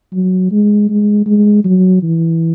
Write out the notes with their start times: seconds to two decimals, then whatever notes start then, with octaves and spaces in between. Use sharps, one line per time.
0.13 F#3
0.52 G#3
0.90 G#3
1.26 G#3
1.65 F#3
2.03 E3